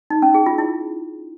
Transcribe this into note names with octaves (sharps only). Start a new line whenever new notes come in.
D#4
C#4
G#4
F4
E4